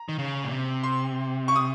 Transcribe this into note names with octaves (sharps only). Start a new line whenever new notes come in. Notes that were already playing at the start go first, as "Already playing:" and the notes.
Already playing: A#5
D#3
C#3
A#2
C3
C6
C#6
D#6